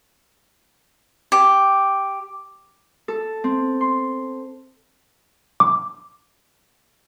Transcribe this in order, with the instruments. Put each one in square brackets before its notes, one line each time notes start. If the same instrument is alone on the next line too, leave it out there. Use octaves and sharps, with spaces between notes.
[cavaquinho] G4
[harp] A4
C4
C6
[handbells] D6